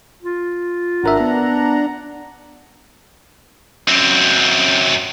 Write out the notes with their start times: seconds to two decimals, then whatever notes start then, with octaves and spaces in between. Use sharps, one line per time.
0.22 F4
1.04 G#1 D4 A#4 E5 F#5 A#5
1.20 B3
3.88 F#2 C4